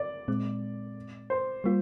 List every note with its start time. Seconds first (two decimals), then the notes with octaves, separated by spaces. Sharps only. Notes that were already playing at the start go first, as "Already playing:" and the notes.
Already playing: D5
0.28 A#2 G#3 C4
1.30 C5
1.64 G3 A#3 F4